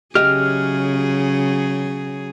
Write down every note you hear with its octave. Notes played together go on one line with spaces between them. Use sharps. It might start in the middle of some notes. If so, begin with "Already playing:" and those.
C#3 F#3 G4 G#4 D#5 E5 F6